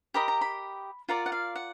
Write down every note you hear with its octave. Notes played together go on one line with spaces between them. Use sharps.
G4 A#4 D#5 B5
A#5
B5
F4 A#4 D5 F#5
F#5
F5
F#5